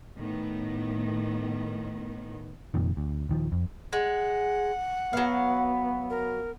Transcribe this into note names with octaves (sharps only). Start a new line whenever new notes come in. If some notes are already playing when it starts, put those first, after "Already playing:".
A2 D#3 B3
F1 F2 A#2 D#3
D2
D#1 D#3 F3
F2
G#3 F#5
F#3 B3 F5
A#4